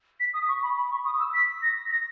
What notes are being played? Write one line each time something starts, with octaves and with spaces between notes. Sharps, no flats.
B6
D#6
C#6
B5
B5
C#6
D#6
E6
B6
A#6
A#6